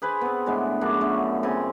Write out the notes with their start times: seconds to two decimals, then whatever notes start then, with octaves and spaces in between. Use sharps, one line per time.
0.02 G#4 B4 C5 G#5
0.21 B3 C4
0.46 A2 D3 G#3 B3
0.81 F#2 D4 F4 G#4
1.01 D3 A3 C#4
1.43 C#3 C4 G#5